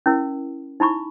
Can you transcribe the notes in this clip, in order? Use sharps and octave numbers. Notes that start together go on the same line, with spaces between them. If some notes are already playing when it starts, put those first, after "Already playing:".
C#4 E4 A#4
D#4 E4 B5 C#6